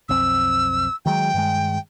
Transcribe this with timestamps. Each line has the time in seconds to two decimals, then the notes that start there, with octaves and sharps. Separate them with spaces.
0.09 B1 F2 C4 E6
1.06 D#3 F#3 G#3 G5
1.34 G2 D#3 G#3